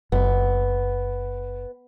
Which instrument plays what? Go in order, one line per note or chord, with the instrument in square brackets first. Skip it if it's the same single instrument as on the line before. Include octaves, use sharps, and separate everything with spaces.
[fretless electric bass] F#1 [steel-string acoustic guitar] B3